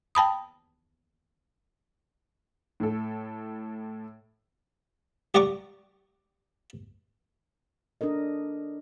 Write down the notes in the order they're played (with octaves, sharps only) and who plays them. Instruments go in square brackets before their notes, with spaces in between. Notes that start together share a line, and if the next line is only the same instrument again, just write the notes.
[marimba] G5 A5 B5 D#6
[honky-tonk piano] A2 A4
[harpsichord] G4 D5 F#5 A#5 C#6 D6
[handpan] D4 A4 A#4 D#5